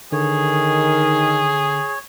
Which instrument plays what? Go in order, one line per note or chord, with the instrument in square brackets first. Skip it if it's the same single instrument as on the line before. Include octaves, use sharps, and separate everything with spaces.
[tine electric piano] D3 [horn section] D#3 [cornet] G#4 [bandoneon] C#5